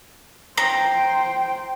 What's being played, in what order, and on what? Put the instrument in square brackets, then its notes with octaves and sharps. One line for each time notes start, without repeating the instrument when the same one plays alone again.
[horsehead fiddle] C5 G5 [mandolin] A#5